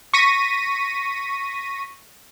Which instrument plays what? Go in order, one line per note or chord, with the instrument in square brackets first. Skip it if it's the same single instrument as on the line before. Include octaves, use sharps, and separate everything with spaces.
[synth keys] C#6 A#6 B6 D#7